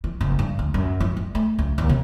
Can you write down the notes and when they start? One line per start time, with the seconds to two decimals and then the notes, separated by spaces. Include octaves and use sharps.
0.04 E3
0.21 F#1
0.39 G2
0.59 D2
0.74 F#2
1.00 E3
1.17 G3
1.35 A3
1.59 C#2
1.78 D#2
1.89 C3